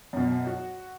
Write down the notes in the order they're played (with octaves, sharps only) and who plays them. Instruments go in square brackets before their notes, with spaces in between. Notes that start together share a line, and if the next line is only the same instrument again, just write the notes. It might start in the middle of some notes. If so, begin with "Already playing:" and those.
[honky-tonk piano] F#2 B2
F#4